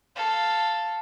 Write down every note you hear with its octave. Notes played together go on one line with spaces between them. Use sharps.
A4 F5